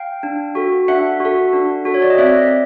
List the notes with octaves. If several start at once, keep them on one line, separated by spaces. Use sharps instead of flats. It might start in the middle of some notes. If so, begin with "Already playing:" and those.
Already playing: F5 G5
D4
F#4 A4
D4 E5 F#5
F#4 A4
D4
F#4 A4
C#5
D5
D#5
C4 D5 E5